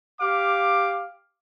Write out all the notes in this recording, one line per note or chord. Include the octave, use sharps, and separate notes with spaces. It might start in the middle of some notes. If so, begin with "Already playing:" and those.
G4 F5 D6